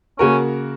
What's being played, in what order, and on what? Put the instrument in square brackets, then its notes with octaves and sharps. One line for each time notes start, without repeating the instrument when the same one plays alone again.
[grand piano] C#3 A#3 F#4 A#4 [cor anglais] C#4